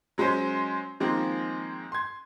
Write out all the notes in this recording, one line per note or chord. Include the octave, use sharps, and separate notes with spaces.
F#3 G#3 C#4 C5
D#3 F3 G#3 A#3 C4
C6 G#6